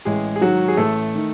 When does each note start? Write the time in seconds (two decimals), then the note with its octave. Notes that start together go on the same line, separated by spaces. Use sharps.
0.05 A1 G#3 G#4
0.36 G#4
0.41 G#2 D#3 F#3 F#4
0.68 G#4
0.77 A1 A3 A4
1.15 D#3